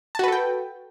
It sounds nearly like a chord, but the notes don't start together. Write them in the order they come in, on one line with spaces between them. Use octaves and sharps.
A5 F#4 B4 A4 G5